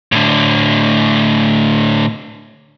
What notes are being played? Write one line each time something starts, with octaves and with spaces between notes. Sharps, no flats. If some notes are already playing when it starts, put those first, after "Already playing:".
A2 D3